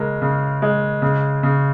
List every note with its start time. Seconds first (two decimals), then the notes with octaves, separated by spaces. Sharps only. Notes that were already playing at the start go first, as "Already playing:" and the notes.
Already playing: C#3 G#3 A#4
0.22 C#3
0.62 G#3
1.02 C#3
1.43 C#3